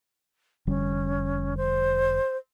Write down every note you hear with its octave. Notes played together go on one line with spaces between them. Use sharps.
F1 D3 G3 C#4
C5